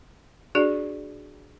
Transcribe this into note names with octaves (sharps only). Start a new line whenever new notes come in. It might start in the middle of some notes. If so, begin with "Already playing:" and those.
D4 F#4 G#4 D5